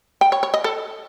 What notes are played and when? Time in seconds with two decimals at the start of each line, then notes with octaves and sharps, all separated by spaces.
0.21 G5
0.32 C#5
0.43 C#5
0.54 D#5
0.64 A4